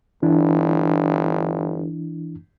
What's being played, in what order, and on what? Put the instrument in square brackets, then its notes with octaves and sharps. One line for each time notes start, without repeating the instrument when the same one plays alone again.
[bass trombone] G1 [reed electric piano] E3 D4 E4